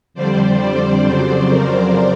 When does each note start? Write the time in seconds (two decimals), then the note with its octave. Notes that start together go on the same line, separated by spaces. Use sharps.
0.14 F2 D3 G3 C5 D5
0.59 C5 D5
1.04 F2 C#3 F#3 C5 D5
1.49 A#4 C5